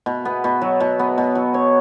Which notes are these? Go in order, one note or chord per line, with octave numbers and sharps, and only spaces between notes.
B2
B3
B2
F#3
B2
B3
B2
F#3
C#5